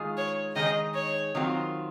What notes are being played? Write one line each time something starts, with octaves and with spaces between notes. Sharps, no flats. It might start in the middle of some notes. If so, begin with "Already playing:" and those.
Already playing: D#3 G#3 F4 G#4
C#5
D#3 G#3 D#4 G#4 D#5
C#5
D#3 F#3 C4 F4